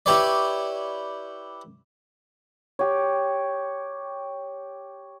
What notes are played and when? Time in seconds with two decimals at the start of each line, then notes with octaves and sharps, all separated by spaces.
0.06 E4 G4 B4 C#5 D5
2.79 G4 C#5